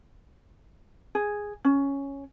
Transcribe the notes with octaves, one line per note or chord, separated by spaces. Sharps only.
G#4
C#4